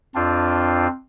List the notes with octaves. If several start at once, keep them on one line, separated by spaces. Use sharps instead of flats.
F2 C4 D4 F4